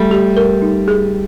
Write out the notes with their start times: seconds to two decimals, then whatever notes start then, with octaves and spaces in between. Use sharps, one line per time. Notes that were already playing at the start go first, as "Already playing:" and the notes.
Already playing: G3 A3
0.11 G4
0.37 A#4
0.62 D#4
0.88 G#4